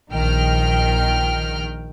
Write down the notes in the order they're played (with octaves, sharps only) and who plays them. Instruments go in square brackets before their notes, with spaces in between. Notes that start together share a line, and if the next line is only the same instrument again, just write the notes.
[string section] A#1 D#3 G5 F6